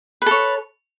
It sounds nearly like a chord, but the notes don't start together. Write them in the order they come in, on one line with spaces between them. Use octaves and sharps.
B4 A4 C#5